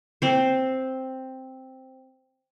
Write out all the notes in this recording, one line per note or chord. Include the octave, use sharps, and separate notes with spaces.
C4 C5